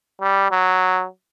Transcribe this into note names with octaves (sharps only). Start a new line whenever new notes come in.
G3
F#3